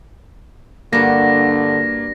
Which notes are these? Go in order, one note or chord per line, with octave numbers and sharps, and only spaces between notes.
G2 D3 A#3 F#4 A#6